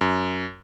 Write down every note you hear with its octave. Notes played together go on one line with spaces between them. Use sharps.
F#2